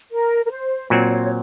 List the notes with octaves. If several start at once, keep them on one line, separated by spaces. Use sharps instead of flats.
A#4
A#4
C5
A#2 F#3 C4 C#5
C#5